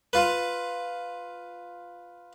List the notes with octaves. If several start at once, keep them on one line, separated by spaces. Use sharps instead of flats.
F4 B4